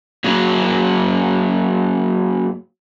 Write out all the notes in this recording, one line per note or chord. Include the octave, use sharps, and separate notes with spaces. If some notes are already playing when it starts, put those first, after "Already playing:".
F#3 A#3 G#4